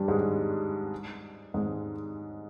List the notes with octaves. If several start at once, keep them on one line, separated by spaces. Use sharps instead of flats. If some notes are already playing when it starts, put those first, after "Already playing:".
Already playing: G2 G3
G#2 G#3
G#2 G#3